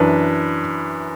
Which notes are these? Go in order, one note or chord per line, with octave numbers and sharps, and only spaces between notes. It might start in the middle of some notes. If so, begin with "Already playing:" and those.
Already playing: F#2 E3 D4 B4